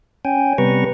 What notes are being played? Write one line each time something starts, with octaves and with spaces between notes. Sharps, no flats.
C#4 G5 G#5
C3 G3 B3 B4 A#5 C#6